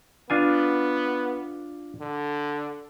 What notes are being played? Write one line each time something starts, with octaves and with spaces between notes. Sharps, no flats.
B3 D4 F4 G#5
D3